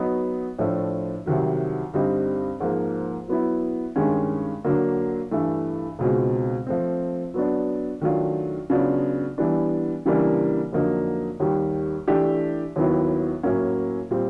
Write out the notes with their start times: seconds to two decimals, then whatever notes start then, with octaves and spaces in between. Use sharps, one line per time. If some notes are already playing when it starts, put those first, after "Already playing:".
Already playing: F#3 B3 D#4
0.59 A2 F3 A3 D4
1.26 C2 C3 D#3 F#3
1.94 G2 D3 G3 C4 D#4
2.60 G#2 F3 A#3
3.28 F#3 B3 E4
3.96 G2 D#3 G#3 C#4
4.65 D3 F#3 A#3
5.31 G2 E3 A3
5.99 C#2 B2 G#3 C4 D#4
6.67 F3 A3 C4
7.34 F#3 B3 D4
8.01 D#3 F#3 A3 D4 F4
8.70 C#3 F#3 B3 D4 F4
9.38 E3 G3 B3 D4
10.05 C#3 E3 G3 A#3 D4
10.72 F2 D3 F#3 A#3 D#4
11.40 D#2 D#3 G3
12.08 E3 A3 D4 G4
12.76 D#2 D#3 F#3 B3 E4
13.43 A2 F#3 A#3 C#4
14.11 A#2 G3 C4